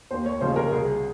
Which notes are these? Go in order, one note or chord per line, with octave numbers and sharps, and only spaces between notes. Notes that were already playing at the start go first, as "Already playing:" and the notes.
D#2 C5
C#5
C#3 F3 G#3 C5
A#4
C2 G#4